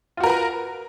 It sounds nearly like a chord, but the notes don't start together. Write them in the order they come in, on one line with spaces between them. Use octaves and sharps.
F4 F#4 A#4 B4 A#5